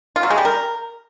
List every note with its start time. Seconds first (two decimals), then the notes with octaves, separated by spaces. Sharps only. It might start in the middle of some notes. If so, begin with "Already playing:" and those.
0.16 F4
0.23 F#3
0.30 G#3
0.38 G3
0.45 A#4